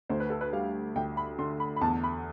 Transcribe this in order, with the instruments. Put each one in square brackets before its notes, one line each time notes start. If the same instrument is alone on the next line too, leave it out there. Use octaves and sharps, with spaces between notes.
[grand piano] D2 [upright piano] C5
[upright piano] B4
A4
B4
[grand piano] G3 [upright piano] F5
[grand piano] D2 [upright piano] G5
[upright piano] B5
[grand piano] D3 [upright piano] C6
[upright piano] B5
B5
[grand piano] E2 [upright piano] A5
[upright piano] B5